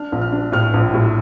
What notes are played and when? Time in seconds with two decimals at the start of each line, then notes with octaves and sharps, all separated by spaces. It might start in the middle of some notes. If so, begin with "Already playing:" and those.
Already playing: D4 F6
0.12 A#1
0.21 F6
0.32 D4
0.52 A2 F6
0.74 A#1
0.94 A2